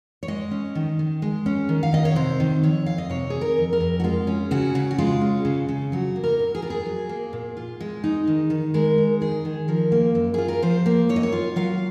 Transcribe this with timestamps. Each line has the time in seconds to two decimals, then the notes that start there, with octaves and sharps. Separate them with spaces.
0.23 C#5
0.28 G#3 D#5
0.51 C#4
0.75 D#3
0.99 D#3
1.22 G#3
1.46 C#4
1.69 D#3
1.83 F5
1.93 D#3 D#5
2.05 C#5
2.16 C3 C5
2.40 D#3
2.63 F2 C#5
2.86 F2 F5
2.98 D#5
3.10 C3 C#5
3.30 D#3 G#4
3.41 A#4
3.58 F2
3.73 A#4
3.80 F2
4.00 F#4
4.04 G#3 F4
4.27 C#4
4.51 C#3 F#4
4.75 C#3
4.91 F#4
4.98 G#3 F4
5.21 C#4
5.45 C#3
5.69 C#3
5.92 F#3 F#4
6.16 A#3
6.24 A#4
6.39 A#2
6.55 G#4
6.62 F4 A#4
6.70 G#4
6.86 F#3
7.09 A#3
7.33 A#2
7.57 F4
7.80 G#3
8.04 D#4
8.27 D#3
8.50 D#3
8.74 G#3 A#4
8.98 D#4
9.21 D#3 G#4
9.45 D#3
9.68 F3 A#4
9.92 A#3
10.15 F#2
10.34 F4 G#4
10.48 A#4
10.62 F3 C5
10.86 A#3
11.09 F#2 C#5
11.16 D#5
11.23 C#5
11.32 F4
11.56 F#3 F5